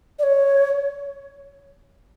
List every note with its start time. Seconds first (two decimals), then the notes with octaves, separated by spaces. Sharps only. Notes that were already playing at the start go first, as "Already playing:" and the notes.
0.19 D5
0.23 C#5